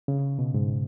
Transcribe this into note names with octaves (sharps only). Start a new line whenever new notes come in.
C#3
B2
G#2